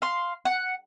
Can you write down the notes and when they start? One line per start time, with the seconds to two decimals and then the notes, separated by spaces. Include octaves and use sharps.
0.02 F5 C6
0.45 F#5